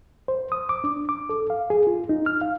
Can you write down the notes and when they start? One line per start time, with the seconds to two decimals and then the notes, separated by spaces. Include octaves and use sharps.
0.28 C5
0.52 D#6
0.69 D6
0.84 D4
1.09 D6
1.30 A4
1.50 F5
1.70 G#4
1.87 F4
2.09 D#4
2.26 F6
2.41 F5